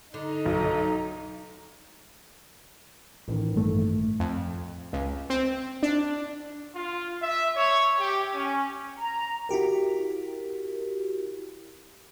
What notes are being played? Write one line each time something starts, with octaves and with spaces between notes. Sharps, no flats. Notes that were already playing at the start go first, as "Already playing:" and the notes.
D3 D#4
B1
A1 A2 D#3
G2 A3
F2
C#2
C4
D4
F4
E5
C#5
G4
C#4
A#5
E4 F#4 G4 A#4